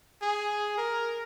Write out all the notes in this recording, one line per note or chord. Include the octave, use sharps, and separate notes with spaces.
G#4
A#4